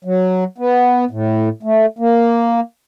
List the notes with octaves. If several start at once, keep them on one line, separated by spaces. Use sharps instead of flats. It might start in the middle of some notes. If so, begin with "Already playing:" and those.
F#3
B3
A2
A3
A#3